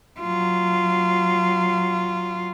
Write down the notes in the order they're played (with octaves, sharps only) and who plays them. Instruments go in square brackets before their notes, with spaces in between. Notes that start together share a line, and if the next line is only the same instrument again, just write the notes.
[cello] F#3 F4